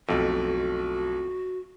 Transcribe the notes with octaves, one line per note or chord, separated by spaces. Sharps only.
B1 F2 A3 F#4